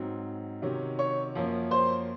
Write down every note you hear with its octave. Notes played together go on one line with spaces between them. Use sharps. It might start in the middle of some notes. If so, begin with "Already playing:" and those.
Already playing: G#2 F#3 C4
C3 D#3 F#3 C#4
C#5 C#6
F#2 F3 A#3 C#4
C5 C6